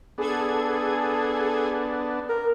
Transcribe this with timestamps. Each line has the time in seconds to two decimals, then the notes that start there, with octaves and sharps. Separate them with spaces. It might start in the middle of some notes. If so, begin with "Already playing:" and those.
0.18 B3 D4 G#4 A4 G#6
2.29 A#4